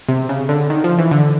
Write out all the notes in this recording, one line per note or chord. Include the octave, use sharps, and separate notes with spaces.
C3
C#3
D3
D#3
F3
E3
D3